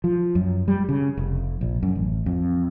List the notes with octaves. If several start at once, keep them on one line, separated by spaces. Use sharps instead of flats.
F3
F#2
G3
C#3
F1
A#1
F#2
A1
F2